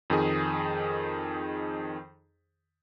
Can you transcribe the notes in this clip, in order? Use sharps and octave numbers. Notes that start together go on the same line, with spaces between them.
F2 D#3 G#4